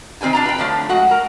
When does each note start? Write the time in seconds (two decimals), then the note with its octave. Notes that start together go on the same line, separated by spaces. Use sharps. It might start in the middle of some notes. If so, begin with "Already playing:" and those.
0.21 D#3 C4 B4 G5 G#5
0.33 D4 F4 A#5
0.46 B4 G5
0.58 D3 F3 A3 C#5
0.89 G#3 F#4 F#5
1.11 A#4